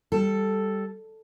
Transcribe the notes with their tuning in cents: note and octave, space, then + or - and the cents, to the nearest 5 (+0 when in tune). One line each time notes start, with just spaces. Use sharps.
G3 +0 A4 +0